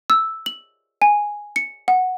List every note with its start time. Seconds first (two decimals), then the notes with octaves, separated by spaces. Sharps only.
0.10 E6
0.46 F#7
1.02 G#5
1.56 C#7
1.88 F#5